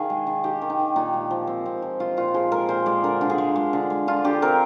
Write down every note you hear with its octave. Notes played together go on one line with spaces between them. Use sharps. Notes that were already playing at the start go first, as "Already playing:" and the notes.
Already playing: D#3 G#4 F5
G#3
D#3
D#3 G4
D#3
D#4
D#3
A#2 D#4
G#3
F3
C4
C4
F3
G#3 F4
A#2 F4
F3 G#4
G#3 A#4
A#2 C5
G#3 D5
D3 A#4
D3
G#4
G#3
G#3
D3
G#3
D3 F4
D3 G4
C4 A#4